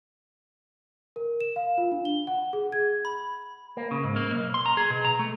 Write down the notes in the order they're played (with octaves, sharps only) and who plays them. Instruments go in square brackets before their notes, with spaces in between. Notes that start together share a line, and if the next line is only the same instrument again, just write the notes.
[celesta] A#4
E7
F5
F4
D4
G7
F#5
G#4
G#6
[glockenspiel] B5
[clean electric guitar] A#3
C#3
G#2
A#3
B1
C6
A#5
G#4
B2
A#5
A3